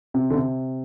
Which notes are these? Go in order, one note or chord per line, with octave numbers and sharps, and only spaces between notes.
C3
D3
C3